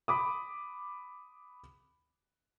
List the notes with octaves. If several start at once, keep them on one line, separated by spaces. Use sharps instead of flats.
B5 D6 D#6